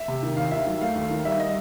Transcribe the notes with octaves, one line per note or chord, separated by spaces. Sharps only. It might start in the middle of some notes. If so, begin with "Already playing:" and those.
Already playing: E5
C3
D#3
D#2 F5
D#3 E5
F#3
A3 F5
D#2
D#3
G3 E5
D#5